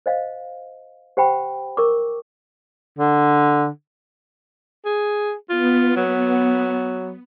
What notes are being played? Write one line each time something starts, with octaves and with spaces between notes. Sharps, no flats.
C5 D#5 F5
G4 C5 F#5 G5 B5
A#4 C#6 D6
D3
G#4
B3 F4
F#3